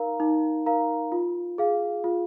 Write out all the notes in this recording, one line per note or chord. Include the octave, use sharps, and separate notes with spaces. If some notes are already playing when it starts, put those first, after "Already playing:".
Already playing: D#4 A#4 F5 A#5
D#4
A#4 F5 A#5
F4
G#4 F5
F4